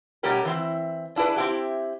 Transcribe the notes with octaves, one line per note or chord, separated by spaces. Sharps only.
B2 G3 A3 C#4 G4 A#4
E3 C4 E4
D4 E4 G#4 B4
C4 E4 G4